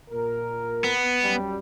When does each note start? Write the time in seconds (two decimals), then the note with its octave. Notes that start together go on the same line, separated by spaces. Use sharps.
0.10 A#2 A#4
0.84 B3
1.23 F#2 F#3 G3